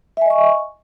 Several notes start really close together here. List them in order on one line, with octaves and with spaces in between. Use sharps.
E5 G#5 D#5 C#6